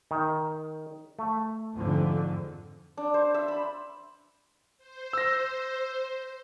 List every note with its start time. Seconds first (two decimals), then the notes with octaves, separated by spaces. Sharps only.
0.11 D#3
1.19 A3
1.75 F2 G#2 D3
2.97 D4
3.14 C5
3.34 E5
3.48 B5
4.78 C5
5.13 E6 A#6